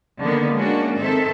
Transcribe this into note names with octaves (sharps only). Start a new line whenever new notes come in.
D3 D#3 A#3 B3
G#3 A#3 C#4 D4 F#4
G#2 D#3 C4 A4 E5